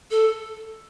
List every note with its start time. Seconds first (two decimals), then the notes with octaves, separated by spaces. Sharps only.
0.11 A4